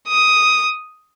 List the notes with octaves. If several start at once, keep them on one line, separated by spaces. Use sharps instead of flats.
D#6